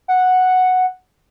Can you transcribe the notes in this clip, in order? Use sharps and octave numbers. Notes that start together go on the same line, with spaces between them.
F#5